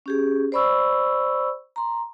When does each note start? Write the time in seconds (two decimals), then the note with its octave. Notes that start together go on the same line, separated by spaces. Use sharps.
0.06 C#4 G4 G#4
0.52 C5 D5 B5 C#6 E6
1.76 A#5 C6